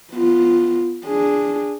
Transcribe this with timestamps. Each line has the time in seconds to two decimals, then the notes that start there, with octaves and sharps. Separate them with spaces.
0.12 B3 F4
1.06 D4 G#4